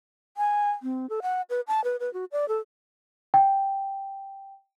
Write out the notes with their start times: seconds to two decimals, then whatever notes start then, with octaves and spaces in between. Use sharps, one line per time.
0.37 G#5
0.83 C4
1.09 A4
1.22 F#5
1.50 B4
1.68 A5
1.84 B4
2.00 B4
2.14 F#4
2.32 D5
2.48 A4
3.34 G5